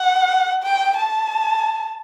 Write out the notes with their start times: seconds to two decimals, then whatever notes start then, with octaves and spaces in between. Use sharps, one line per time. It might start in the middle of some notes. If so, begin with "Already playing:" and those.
Already playing: F#5
0.63 G5
0.97 A5